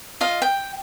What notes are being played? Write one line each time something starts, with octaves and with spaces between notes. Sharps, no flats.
F4 D#5 F5
G5